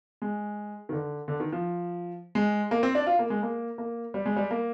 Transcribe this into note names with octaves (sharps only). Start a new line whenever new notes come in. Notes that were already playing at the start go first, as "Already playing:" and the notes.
G#3
D#3
D3
D3
D#3
F3
G#3
A#3
C4
D4
F4
A#3
G#3
A#3
A#3
G3
G#3
G3
A#3